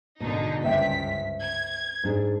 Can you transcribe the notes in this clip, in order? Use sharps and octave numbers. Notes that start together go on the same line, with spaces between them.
G#1 B2 D3 D#4
C#2 G2 C5 E5 G5 B6
G#6
G#2 D4 G#4